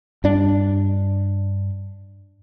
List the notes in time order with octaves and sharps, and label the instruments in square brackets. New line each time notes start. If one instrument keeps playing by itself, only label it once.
[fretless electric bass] G2 D4